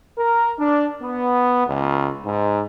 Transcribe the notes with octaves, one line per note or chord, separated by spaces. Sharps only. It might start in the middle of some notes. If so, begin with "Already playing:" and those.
A#4
D4
B3
C#2
G#2